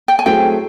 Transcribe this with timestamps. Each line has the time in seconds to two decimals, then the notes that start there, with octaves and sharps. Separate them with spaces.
0.08 G5
0.19 G#5
0.26 F#3 A3 C4 E4 G#4 G5